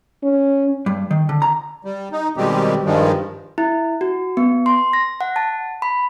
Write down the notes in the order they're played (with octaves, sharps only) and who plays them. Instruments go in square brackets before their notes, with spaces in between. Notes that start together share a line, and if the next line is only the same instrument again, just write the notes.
[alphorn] C#4
[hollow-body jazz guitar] G2
D#3
D3
A#5
[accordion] G3
D#4
B2 D#3 G3 G#3 C4 G4
G2 D#3 F3 G3 G#3
[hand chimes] E4
F#4
B3
C6
A#6
F#5
A5
B5